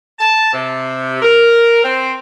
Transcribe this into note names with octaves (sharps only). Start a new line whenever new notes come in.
A5
C3
A#4
C4